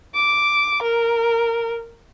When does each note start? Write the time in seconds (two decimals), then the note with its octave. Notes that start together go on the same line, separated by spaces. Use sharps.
0.14 D6
0.82 A#4